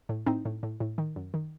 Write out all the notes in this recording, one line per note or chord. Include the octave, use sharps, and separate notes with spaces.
A2
A2 C4 D#4
A2
A2
A2
D#3
F#2
D#3